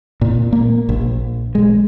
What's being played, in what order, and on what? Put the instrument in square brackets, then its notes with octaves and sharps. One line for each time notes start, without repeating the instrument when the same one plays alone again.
[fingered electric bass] A#2
A#3
A#1
G#3